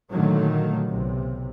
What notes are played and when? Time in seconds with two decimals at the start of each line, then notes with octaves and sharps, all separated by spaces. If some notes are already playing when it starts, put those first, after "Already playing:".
0.11 A#2 D3 D#3 F#3 A3
0.86 B1 C3